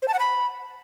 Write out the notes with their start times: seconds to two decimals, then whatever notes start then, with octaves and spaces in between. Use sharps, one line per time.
0.02 C5
0.08 A5
0.14 F#5
0.19 B5